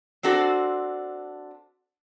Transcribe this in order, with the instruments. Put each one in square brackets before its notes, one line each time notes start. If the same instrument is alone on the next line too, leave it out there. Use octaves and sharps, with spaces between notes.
[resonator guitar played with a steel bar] C4 D4 F#4 A4 C5